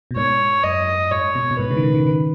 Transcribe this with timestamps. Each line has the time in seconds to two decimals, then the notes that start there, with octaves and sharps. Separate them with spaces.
0.11 B2
0.16 G#2 C#5
0.64 F#2 D#5
1.11 G#2 C#5
1.35 B2
1.51 B2
1.59 G#2 B4
1.71 C#3
1.77 D#3
1.83 C#3
1.95 D#3
2.06 D#3